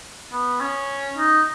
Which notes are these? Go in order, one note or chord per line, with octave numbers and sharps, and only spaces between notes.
B3
C#4
D#4